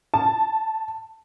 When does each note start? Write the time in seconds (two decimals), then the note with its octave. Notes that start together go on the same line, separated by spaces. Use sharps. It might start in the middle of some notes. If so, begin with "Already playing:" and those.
0.14 A5